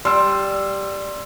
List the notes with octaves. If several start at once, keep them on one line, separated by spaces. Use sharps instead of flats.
G3 C6 E6